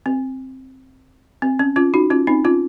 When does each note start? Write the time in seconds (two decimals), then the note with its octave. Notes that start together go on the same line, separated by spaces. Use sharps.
0.06 C4
1.42 C4
1.59 C#4
1.76 C#4 F4
1.94 D#4 F#4
2.10 C#4 F4
2.27 C4 D#4
2.45 C#4 F4